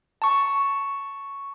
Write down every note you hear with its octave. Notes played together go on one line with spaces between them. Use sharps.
A5 C#6